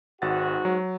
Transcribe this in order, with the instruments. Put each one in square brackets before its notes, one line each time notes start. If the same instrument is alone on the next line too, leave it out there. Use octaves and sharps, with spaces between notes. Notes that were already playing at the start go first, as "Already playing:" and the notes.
[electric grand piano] G#1 F#5 A6 [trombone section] G#2 F#4
[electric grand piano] F#3